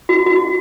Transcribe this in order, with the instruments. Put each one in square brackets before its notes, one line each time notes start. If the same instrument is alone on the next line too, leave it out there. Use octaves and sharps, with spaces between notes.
[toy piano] F#4
F#4